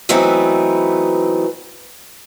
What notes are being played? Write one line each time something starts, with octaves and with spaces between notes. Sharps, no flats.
E3 F#3 A3 B3 C4 D#4